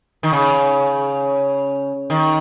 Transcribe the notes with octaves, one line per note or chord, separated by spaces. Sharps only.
D#3
C#3
D#3